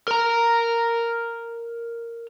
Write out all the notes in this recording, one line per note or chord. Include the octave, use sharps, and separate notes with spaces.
A#4 A#5